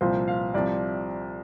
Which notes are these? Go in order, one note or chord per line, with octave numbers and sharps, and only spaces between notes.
C2 A#2 F3 C5
F5
C2 C3 F3 D5